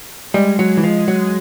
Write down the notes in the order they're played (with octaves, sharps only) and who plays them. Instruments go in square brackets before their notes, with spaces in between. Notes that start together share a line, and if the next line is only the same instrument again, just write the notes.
[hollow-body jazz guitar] G3 [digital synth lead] G#3
[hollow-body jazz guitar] F#3
E3
F3
F#3